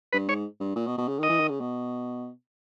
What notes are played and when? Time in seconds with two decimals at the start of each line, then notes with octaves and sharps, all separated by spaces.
0.13 G2 B4
0.28 G#2 C#5
0.60 G2
0.76 A#2
0.87 B2
0.98 B2
1.08 C#3
1.19 D#3 D#5
1.29 E3
1.40 D#3
1.50 C#3
1.60 B2